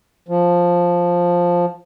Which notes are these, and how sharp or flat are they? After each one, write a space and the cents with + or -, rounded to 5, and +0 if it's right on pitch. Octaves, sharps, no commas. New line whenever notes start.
F3 +5